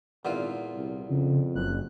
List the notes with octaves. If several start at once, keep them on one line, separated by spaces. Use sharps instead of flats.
G#1 E2 A#2 F4
C2
F2 C#3
F#1 F#6